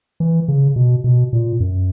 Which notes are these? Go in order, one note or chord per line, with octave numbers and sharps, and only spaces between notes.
E3
C#3
B2
B2
A#2
F#2